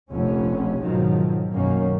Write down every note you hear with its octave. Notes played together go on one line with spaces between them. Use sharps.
F1 A#1 F2 C#4
G#2 B2 D#3 F3 F#3
B1 F#2 D#3 A#3 C#4